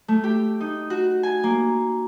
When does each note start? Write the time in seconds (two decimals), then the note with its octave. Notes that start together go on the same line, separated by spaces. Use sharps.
0.08 A3
0.24 G4
0.60 D#4
0.90 F#4
1.23 G#5
1.44 A#3